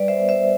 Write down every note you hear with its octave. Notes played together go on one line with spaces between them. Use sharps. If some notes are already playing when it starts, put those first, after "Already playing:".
Already playing: G3 B4 D5
C5 E5
B3
C5 E5